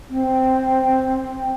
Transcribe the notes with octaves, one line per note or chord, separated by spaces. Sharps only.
C4